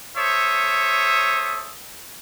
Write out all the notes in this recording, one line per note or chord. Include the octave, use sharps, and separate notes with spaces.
A4 C5 C#5 E5 D#6